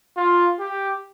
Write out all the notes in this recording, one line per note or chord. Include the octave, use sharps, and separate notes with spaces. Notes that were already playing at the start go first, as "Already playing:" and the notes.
F4
G4